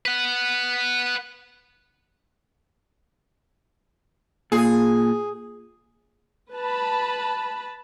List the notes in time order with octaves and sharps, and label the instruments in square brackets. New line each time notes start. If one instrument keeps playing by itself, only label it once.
[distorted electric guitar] B4 F#5
[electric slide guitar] A#2 [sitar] G#4
[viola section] B4 A5 B5